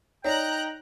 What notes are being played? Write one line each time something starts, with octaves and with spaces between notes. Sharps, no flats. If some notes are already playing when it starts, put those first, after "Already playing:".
D#4 C#5 D5 G5 A#5 F#6